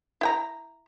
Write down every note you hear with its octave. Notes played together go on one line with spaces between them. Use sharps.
E4 G5 A#5